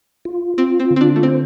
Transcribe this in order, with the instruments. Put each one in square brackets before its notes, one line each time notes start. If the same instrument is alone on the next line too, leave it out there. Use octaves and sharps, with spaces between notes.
[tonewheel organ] F4
[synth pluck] C4 [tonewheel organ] F4
[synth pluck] C4
[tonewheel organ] D3
[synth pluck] C4
D4
A3
[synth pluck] C4 [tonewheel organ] C5